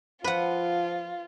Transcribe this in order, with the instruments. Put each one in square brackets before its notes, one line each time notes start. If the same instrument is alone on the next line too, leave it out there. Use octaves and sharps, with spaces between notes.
[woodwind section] F3 [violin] F4 [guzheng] B4 F#5